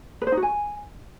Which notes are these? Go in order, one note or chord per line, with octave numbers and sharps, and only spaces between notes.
B4
C5
D#4
F#4
G#5